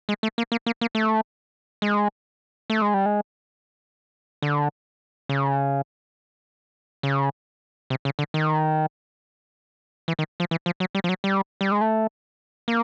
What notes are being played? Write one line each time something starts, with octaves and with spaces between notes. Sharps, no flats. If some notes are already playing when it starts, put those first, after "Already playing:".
G#3
A3
A#3
A#3
A#3
A#3
A3
G#3
A3
G#3
G3
G#3
D3
C#3
C#3
C3
C#3
D3
D#3
E3
D#3
F3
E3
F3
F#3
G3
F3
F#3
G3
G3
G#3
A3
A#3